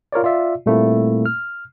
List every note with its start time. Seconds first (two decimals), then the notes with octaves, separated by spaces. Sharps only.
0.12 F4 A#4 C#5 D5
0.24 F4 D5 E5
0.66 A#2 G3 A3 A#3 C4 E4
1.26 F6